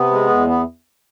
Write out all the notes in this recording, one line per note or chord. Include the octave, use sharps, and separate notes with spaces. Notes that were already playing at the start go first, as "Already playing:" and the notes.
Already playing: C3 B3
G#3
E2
B3